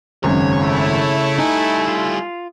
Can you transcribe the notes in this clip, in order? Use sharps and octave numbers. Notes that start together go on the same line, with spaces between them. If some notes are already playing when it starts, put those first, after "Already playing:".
G#1 F#2 C#3 C#5
A3 E4
G3 D#4 G#5
F4